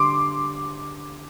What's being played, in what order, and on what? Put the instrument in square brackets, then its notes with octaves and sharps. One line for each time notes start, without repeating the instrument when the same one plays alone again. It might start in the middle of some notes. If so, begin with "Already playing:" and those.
Already playing: [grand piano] D3 G3 D4 [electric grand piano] C6 D6